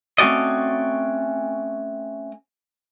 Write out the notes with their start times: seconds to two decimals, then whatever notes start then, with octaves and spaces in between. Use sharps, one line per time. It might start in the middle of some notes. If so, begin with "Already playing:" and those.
0.18 A3 C4 C#4 F#4 D5 D#5